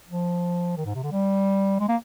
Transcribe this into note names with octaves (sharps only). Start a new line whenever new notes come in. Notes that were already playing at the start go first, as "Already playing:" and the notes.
F3
D#3
G#2
C3
D3
G3
G#3
A#3